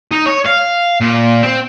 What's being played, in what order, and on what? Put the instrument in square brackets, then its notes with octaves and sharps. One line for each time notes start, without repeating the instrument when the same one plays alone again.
[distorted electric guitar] D#4
C#5
F5
A#2
C4